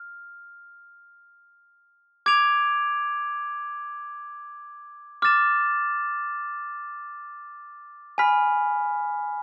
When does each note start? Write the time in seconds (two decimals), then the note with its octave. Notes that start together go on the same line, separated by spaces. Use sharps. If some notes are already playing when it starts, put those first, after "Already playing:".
Already playing: F6
2.26 D6 G#6 D7 F7
5.22 D6 F6 A6 E7
8.18 G#5 B5 F6 B6